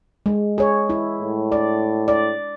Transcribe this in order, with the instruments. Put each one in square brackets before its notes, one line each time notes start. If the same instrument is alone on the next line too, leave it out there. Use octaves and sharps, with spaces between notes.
[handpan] G#3
G#4 C#5
E4
[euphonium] A2
[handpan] D5
D5